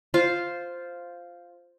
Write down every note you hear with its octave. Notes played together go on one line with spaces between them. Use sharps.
F4 C5 F5